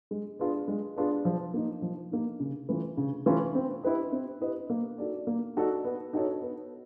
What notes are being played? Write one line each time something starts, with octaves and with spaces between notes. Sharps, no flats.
G#3
B3 D4 F4 G#4
G#3
B3 D4 F4 G#4
F3
A#3 D#4
F3
A#3 D#4
C#3
E3 A3 C#4 F4
C#3
E3 A3 C#4 F4
C4
E4 G4 B4 D#5
C4
E4 G4 B4 D#5
A#3
D#4 F#4 A4 D5
A#3
D#4 F#4 A4 D5
B3
D#4 F#4 A4 C#5
B3